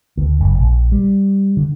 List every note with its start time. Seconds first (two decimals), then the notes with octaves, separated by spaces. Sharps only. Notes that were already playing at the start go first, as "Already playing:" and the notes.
0.17 D2
0.40 F#1
0.59 A#1
0.92 G3
1.57 D3